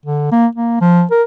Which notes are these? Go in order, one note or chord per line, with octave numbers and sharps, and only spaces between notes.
D3
A#3
A#3
F3
A#4